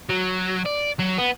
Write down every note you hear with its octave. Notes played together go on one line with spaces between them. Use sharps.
F#3
D5
F#3
B3